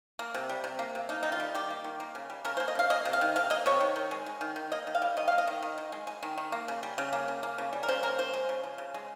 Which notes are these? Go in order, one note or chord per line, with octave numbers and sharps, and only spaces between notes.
A#3
C3
G3
C3
A#3
C3
A#3 D#4
D#3 D#4
F4
G3
D#3 G4
A#3
D#3
A#3
C#3
G3
C#3 A#4
C5
A#3
D#5
C#3 F5
A#3 D#5
C3
F5
D#3
C3 F5
A#3 D#5
C3 C#5
D#3
D#3
G#3
G#3
D#3
D#3
A#3 D#5
D#3
F5
G3
D#3 D#5
A#3 F5
D#5
D#3
D#3
D#3
G#3
G#3
D#3
D#3
A#3
C#3
G3
C#3
A#3
C#3
A#3
C#3
G3
A#4
C#3 C5
A#3 A#4
C#3 C5
G#3
C#3
F3
C#3
G#3